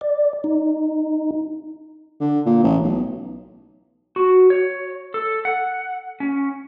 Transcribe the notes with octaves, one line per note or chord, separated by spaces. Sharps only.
D5
D#4
D3
A#2
A1
B1
F#4
C#5
A4
F#5
C#4